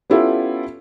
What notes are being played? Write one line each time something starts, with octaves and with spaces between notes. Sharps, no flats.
B3 C#4 E4 F4 G4 A4